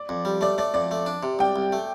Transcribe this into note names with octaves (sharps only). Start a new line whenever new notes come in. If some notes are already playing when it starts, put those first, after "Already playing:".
Already playing: D5
F2
G3
A3 D5
A3 D5
F2 D5
A3
D4
C3
C2 G5
C2
A3